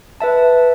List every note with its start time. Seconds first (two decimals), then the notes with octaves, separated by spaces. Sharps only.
0.20 B4 E5 A5